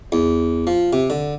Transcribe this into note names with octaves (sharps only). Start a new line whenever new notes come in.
E2
F3
C3
D3